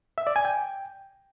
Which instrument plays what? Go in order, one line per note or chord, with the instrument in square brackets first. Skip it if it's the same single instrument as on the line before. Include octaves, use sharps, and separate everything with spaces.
[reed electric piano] E5
D5
G#5
G5